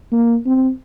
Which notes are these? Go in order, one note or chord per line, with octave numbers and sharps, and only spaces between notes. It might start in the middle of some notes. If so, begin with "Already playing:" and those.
A#3
C4